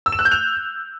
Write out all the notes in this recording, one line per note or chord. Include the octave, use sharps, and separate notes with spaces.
E6
E7
F#6
G6
F7